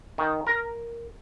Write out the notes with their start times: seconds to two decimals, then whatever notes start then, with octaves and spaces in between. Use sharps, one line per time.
0.18 D#3
0.47 A#4